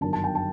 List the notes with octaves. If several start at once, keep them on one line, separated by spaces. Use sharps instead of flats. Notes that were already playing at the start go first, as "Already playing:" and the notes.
G1 F#2 D#3 A5
A5
G5
A5